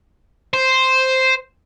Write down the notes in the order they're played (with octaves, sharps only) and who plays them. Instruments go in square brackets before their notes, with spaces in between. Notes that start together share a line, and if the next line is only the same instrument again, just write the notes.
[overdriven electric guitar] C5